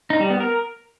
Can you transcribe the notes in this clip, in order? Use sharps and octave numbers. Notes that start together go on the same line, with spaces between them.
D#4
G3
B3
A#4